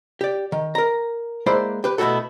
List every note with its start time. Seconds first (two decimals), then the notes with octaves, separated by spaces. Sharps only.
0.21 G4 D5
0.52 D#3
0.75 A#4 A#5
1.46 G#3 A#3 E4 C5 D5
1.84 G4 B4
1.98 B2 A3 B3 E4 F#4 A4